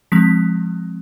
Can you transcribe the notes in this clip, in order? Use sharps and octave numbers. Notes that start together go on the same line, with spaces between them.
F3 G#3 C4 B6